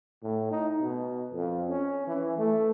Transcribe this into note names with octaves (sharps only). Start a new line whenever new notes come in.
A2
D#4
B2
F2
C#4
E3
A3